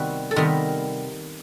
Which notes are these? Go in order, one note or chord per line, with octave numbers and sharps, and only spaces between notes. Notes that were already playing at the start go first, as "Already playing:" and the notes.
Already playing: C3 D#3 G3 B3 F#4
A4
C3 D#3 G3 B3 A#4